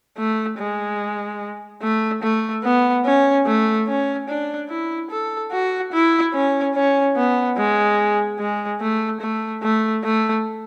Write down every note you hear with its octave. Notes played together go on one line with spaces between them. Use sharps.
A3
G#3
A3
A3
B3
C#4
A3
C#4
D4
E4
A4
F#4
E4
C#4
C#4
B3
G#3
G#3
A3
A3
A3
A3